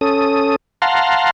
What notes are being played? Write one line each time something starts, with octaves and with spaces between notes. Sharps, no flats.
C#4 A4 D#6
F5 F#5 A5 A#5 C6